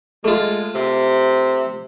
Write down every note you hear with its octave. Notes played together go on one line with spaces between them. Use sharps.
G#3 A3 F4
C3